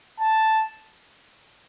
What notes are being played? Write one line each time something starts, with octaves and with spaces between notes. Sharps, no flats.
A5